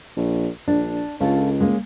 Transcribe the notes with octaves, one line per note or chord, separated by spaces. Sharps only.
A#1
A#1 D4
C#2 C#4 F4 A4
G#3 A#3 C#4